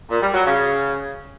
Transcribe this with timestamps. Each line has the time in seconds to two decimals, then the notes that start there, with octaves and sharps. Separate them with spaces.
0.10 A#2
0.22 G3
0.34 F#3
0.46 C#3